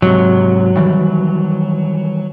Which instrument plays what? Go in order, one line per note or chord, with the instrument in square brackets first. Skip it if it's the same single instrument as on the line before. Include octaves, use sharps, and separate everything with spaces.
[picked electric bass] G#2 C3 [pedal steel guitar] F#3
[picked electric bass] D#3 E3 G3